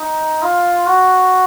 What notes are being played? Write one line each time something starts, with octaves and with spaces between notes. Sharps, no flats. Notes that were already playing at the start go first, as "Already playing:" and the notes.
Already playing: D#4
F4
F#4